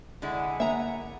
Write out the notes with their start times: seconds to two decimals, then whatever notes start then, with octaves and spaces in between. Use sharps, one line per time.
0.22 D3 G#3 E4 F#5 G#5
0.60 A#3 E5 A#5